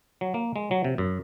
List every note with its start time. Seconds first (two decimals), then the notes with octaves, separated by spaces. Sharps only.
0.21 F#3
0.34 A#3
0.56 G#3
0.71 F#3
0.84 C3
0.98 F#2